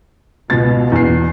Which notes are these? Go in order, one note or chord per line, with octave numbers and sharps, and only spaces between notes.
C#2 B2 A6
E2 C7